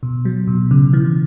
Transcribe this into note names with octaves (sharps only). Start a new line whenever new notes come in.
B2
F#3
B2
C#3
E3